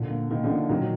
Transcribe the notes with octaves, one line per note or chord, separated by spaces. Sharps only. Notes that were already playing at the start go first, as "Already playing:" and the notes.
Already playing: A#2 D3 F3
A#3
D#3 A#3
D3 F3
A#3
A#2 D#3 F#3